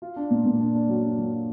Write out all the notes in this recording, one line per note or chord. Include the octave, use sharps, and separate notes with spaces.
F4
D4
A#2
A#2
D4
D4
F#3
D4
F#3
F4